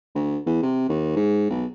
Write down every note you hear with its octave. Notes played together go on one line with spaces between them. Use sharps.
D2
E2
C3
D#2
G#2
B1